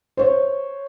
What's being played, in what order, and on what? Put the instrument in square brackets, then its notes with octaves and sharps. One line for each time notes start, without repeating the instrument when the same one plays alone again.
[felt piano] C5 C#5